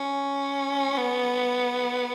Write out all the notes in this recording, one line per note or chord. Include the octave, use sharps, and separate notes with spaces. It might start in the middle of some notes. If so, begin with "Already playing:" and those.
Already playing: C#4
B3